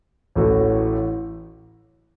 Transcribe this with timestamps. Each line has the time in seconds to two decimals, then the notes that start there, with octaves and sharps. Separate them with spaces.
0.35 A1 A2 A3 F#4